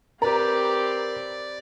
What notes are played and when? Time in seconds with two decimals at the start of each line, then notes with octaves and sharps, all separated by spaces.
0.22 C4 G4 A#4 B4 D5 A#5